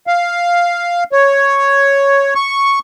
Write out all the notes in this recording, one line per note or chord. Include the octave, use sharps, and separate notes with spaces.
F5
C#5
C#6